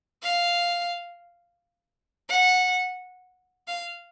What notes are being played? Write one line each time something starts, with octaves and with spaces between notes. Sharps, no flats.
F5
F#5
F5